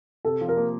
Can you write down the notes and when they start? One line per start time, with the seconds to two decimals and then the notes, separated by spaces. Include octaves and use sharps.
0.25 C3 A4
0.41 F3
0.48 A#4
0.57 A#3